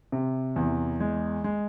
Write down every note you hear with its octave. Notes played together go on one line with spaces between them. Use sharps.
C3
E2
G#3
G#3